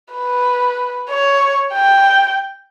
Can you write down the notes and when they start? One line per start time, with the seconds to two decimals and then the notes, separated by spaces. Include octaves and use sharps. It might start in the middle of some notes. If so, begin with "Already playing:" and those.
0.13 B4
1.09 C#5
1.74 G5